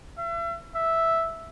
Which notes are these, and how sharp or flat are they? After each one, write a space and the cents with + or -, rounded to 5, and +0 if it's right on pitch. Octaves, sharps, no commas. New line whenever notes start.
E5 +40
E5 -5